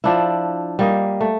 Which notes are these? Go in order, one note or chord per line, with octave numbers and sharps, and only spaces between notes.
F3 D4 E4
G3 A#3 D#5
A3